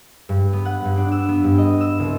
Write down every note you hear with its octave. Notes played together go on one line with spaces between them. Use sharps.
G2
B3
F#5
G2
D4
E6
B3
G2
D#5
E6
C2